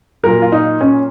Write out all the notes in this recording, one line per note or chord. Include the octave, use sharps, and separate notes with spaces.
A#2 F#3 A#4
F4
D#4
C#4